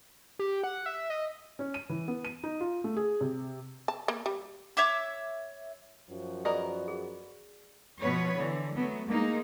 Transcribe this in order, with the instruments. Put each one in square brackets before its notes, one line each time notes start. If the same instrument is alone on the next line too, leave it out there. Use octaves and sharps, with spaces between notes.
[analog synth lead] G4
F#5
E5
D#5
[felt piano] C#4
D#7
E3
B3
D#7
D#4
F4
A3
G#4
C3
[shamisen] A5
A#3
G3
[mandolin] C#5 E5 D6 E6
[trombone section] F#2 F3 F#4
[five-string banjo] B3 A#4 D#5 [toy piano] G#4 D5
[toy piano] G#4
[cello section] B2 F3 B3 B4 C#5
D3 E3
F#3 A3 B3
G#3 A#3 D#4